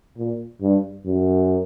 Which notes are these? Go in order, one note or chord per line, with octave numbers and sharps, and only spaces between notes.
A#2
G2
F#2